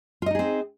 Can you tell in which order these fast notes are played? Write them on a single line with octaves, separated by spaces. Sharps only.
F4 D#5 D#4 G#4 C4